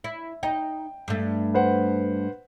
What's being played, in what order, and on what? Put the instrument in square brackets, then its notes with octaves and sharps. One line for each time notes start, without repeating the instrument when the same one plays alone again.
[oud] E4
[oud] D#4 [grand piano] G5
[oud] G2 A3
[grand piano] B4 C5 F#5